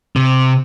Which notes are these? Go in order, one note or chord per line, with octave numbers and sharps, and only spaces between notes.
C3